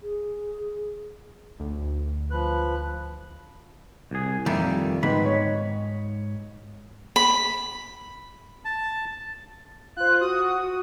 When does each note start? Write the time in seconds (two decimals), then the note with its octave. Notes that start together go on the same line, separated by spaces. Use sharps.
0.03 G#4
1.60 D2
2.31 F3 B4 F#6
4.11 C2 G#4
4.46 F2 A#2 D#3 G3 E5
5.03 G#2 D#3 B3 B5
5.25 C#5 D#5
7.16 B5
8.65 A5
9.96 F4 C5 F#6
10.21 F#4 D#6